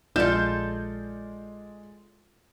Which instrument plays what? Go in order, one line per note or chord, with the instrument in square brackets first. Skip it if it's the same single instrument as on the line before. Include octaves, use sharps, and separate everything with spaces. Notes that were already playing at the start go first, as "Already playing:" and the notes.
[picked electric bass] A#1 [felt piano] G#3 [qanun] F4 A4 [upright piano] D5 G6 E7